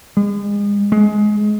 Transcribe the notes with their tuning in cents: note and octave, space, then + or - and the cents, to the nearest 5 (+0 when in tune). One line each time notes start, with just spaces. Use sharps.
G#3 -35
G#3 +20